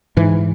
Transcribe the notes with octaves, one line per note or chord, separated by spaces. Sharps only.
G#2 E3